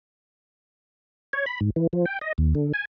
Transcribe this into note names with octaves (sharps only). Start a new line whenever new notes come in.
C#5
B5
G#2
E3
F3
G5
D#5
D#2
D3
G#5